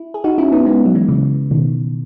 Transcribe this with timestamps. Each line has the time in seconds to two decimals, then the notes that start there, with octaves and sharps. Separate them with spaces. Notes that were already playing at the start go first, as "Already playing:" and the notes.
Already playing: E4
0.14 G#4
0.24 D#4 F#4
0.38 C#4 E4
0.52 B3 D#4
0.66 G#3 B3
0.85 F#3
0.95 E3 G#3
1.08 C#3 E3
1.51 B2 D#3